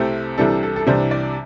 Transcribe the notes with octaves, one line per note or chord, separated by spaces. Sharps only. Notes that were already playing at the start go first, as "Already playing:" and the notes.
Already playing: C2 C3 A3 C4 G4
C2 C3 E3 G3 D4 A4
A4
A4
C2 C3 E3 G3 D4 C5
D5